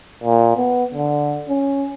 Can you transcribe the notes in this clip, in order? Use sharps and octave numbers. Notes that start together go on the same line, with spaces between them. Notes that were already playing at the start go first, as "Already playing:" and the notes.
A#2
B3
D3
C#4